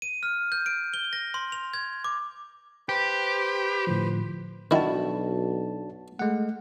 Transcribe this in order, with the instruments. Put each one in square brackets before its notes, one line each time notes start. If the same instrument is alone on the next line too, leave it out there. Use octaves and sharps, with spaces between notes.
[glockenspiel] D#7
F6
G6
D7
G7
A#6
C6
F7
G#6
D6
[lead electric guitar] G4 [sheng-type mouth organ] B4 C5
[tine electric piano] A2 D3 F3
[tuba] B1 [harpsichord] D#3 E4 [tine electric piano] D4 F#4 A5
[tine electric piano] G#3 F#5 [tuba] A3